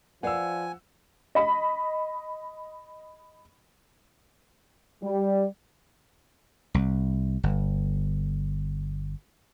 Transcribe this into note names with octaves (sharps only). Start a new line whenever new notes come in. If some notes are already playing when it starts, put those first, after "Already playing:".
F3 B4 D5 F5 F#5 G#5 E6
D#5 B5
G3
C2
G1